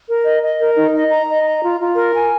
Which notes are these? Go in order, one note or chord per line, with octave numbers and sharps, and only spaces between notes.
A#4
D#5
D#5
A#4
D#4
D#5
A#5
D#5
A#5
F4
F4
A#4
G#5